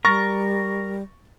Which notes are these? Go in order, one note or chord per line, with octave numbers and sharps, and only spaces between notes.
G3 A#4 C#6 A6 A#6